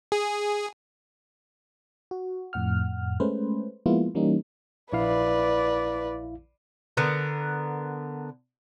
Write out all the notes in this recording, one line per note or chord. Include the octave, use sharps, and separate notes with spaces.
G#4
F#4
F2 A2 F#5 F6
G#3 A3 C#4 B4 C5
F3 G#3 A#3 B3 E4 F4
E3 G3 A#3 C#4 D#4
A#1 E4 B4 D5 F5
D3 B3 A#4